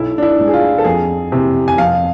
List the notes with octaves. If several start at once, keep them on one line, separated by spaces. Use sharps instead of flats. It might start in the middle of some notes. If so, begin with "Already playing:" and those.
Already playing: B1 E4
D4
E4
A2 G#3
G#4
F4
A4
F2 G#4
C3 E3
G#5
F2 F5